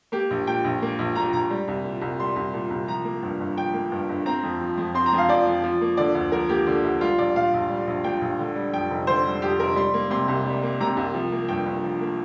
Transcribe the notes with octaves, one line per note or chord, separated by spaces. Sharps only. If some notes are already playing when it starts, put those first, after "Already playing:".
A#3 G4
A#1
A#2 G5
A#1
A#3
A#1
A#2 A#5
A#1 A#5
G3
C2
A#2
C2
G3 C6
C2
A#2
C2
F3 A#5
A#3
G2
G1
F3 G5
A#3
G2
G1
C4 A#5
F2
F3
F2
C4 C6
A#5
F2
F5
F3 D5
F2
F3
A#3
D3 D5
D2
F3 A#4
A#3 G4
D3
D2
G3 F4
A#1 D5
A#2 F5
A#1
G3
A#1
A#2 G5
A#1
D3
G3
F2 G5
F1
D3 C5
G3
F2 G4
F1 A#4
G3 C6
A#3
C3 C6
C2
G3
A#3
C3 A#5
C2
F3
A#3
G2 G5
G1
F3
A#3